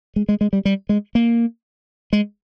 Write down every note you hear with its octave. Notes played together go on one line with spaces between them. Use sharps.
G#3
G#3
G#3
G3
G3
G#3
A#3
G#3